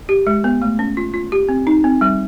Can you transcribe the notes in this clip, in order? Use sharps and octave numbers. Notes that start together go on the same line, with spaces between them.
G4
G#3
B3
A3
C#4
F4
F4
G4
C4
D#4
C4
G3